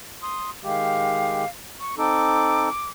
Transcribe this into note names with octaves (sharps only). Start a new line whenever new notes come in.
C6 D#6
D#3 G#3 G4 F5
C#6
C4 D#4 A4 D6